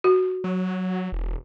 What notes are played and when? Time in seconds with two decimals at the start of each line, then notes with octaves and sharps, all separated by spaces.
0.04 F#4
0.44 F#3
1.12 E1